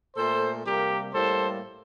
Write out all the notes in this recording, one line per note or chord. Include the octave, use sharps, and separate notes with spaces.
A#2 A3 A4 C5
C3 G3 A#3 G4 A#4
A2 G3 A#3 A4 C5